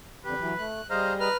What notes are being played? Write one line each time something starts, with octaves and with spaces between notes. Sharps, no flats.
F2 D3 G4 B4
E3 F#3
A3 F#6
G3 G#4 C5 D#5 F5 A#5
B4 A#5 F6